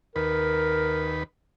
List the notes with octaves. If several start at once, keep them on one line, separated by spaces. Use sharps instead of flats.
D#2 A#4 B4